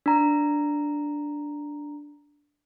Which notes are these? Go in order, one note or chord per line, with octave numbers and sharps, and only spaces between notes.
D4 A#5